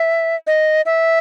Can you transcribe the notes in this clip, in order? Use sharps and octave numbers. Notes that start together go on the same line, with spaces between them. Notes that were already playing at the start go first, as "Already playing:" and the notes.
Already playing: E5
D#5
E5